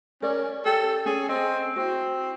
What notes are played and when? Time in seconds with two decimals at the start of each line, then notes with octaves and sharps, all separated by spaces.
0.22 C#4 A#4 D5
0.66 G4 A4
1.06 C#4 G#4
1.29 C4 D#5
1.76 C4 E4 F#4